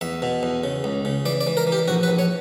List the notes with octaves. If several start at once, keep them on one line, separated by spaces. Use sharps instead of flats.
E2 E5
B2
E2
C#3
C#2
C#3
E3 D5
D5
E3
A#4
E3
G4
A#1 F#4
B4
A#1
C#5